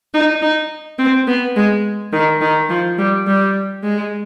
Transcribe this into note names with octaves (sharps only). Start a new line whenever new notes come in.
D#4
D#4
C4
B3
G#3
D#3
D#3
F3
G3
G3
G#3